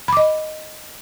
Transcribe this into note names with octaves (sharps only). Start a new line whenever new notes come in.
D#5 B5 D6